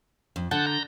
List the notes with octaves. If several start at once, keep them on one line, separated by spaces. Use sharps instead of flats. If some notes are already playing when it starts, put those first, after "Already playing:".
F2
D3 F#5 A5 G6
A#5 G6